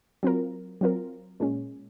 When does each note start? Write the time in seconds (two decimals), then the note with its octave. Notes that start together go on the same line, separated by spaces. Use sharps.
0.23 F#3 C4 F4 A#4
0.81 F#3 C4 F4 A#4
1.40 A#2 G#3 C#4